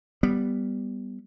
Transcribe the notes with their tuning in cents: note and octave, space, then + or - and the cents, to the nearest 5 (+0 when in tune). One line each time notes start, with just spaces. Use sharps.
G3 +0 B3 +0